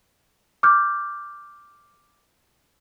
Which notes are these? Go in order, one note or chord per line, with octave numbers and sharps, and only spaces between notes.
D6 F6 G6